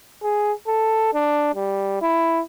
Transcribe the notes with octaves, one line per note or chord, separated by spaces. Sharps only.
G#4
A4
D4
G3
E4